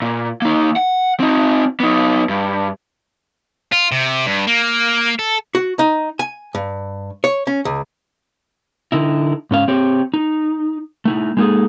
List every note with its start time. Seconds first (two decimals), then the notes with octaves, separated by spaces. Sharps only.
0.02 A#2
0.42 A#3 D#4
0.76 F#5
1.20 C4 D#4
1.80 B3 D#4
2.29 G2
3.72 F4
3.92 C3
4.27 G2
4.48 A#3
5.19 A4
5.55 F#4
5.79 D#4
6.19 G#5
6.55 G2
7.24 C#5
7.47 C#4
7.65 C#2
8.92 D3 D#4 E4
9.51 G#2 C#4 F5
9.68 C4 G4 C#5
10.14 D#4
11.05 A3 D#4 E4
11.37 G#3 A#3 D#4 F#4 G#4 A4